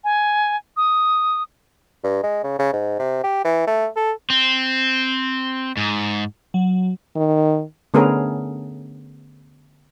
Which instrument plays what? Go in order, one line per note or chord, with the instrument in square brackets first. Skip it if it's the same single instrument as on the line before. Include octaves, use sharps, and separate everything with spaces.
[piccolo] G#5
D#6
[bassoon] G2
G#3
C#3
C#3
G#2
C3
G4
E3
A3
A4
[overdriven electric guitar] C4
G#2
[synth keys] F#3
[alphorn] D#3
[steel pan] D3 A3 B3 C#4 G#4 A#4